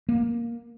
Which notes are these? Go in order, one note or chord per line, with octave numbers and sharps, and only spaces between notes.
A#3